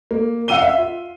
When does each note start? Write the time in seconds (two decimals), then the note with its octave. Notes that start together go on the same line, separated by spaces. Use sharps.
0.11 A#3
0.48 F5 F#5 E6 D#7 G7
0.62 E5
0.78 F4